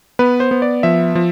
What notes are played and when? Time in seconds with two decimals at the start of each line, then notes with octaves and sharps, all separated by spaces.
0.19 B3 B4
0.40 C5
0.51 B3
0.62 D5
0.83 F3 E5
1.15 F3